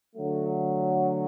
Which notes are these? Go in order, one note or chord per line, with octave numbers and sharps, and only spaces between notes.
D3 F#3 A3